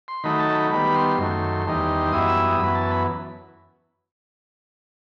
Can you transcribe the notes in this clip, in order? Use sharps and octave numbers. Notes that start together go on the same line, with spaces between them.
C6
D#3 F#3 A3 D#4 B5
A5
B5
D#3 G3 B3 B5
C6
F#2 D#3 A3
E2 D#3 G3 D#4
F#2 E3 G3 B3 E4 D#6
E6
D#6
F#2 E3 B3 B5
A5
B5